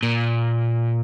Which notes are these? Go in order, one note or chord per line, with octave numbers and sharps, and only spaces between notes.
A#2